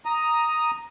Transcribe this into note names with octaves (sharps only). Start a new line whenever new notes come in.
A#5 D#6